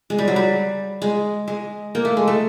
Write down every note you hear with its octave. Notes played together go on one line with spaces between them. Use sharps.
G#3
G3
F#3
G3
G#3
G#3
A#3
A3
G#3
A3